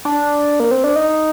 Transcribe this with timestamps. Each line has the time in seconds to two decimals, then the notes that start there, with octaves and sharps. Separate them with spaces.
0.05 D4
0.60 A#3
0.71 C4
0.84 D4
0.96 D#4